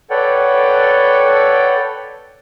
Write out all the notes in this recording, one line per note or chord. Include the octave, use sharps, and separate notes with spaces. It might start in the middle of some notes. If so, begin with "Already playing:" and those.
A4 B4 C#5 D5 F#5 G5